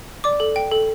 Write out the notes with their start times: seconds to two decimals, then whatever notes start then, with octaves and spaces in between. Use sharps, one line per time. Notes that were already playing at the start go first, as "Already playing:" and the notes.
0.24 D5 D6
0.40 A4
0.56 G5
0.71 A4